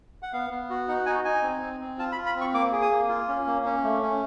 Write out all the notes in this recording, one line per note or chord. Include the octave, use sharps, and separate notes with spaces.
F#5
B3 F5
B3
F#4
D#4 F#5
D#4 G#5
D#4 G#5
C4
C4
C4
F4 A5
B5
F4
B5
C4
C#6
A#3 D6
G#4
D#6
A#3
F4
C#4
A#3
C#4
A3
C#4